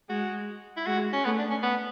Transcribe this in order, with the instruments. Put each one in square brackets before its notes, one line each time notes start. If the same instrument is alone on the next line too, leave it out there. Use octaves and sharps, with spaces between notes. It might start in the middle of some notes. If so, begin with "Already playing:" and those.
[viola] G#3 [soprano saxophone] F#4
[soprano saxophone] E4
[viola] G#3 [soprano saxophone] F#4
[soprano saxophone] C#4
[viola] A3 [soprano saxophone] B3
[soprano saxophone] D4
C#4
B3